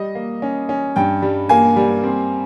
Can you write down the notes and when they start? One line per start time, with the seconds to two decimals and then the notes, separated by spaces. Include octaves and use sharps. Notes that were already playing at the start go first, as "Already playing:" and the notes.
Already playing: G3 D#5
0.15 A#3
0.42 C#4
0.69 C#4
0.96 G2 G5
1.22 G3
1.49 A#3 G#5
1.76 G3
2.04 C4